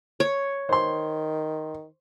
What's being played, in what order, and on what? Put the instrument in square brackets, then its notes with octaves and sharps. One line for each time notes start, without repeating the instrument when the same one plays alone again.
[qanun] C#5
[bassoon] D#3 [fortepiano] C5 C6